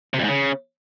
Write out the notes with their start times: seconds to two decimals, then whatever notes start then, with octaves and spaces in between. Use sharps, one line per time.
0.14 C3
0.19 F2
0.24 G#2
0.29 C#3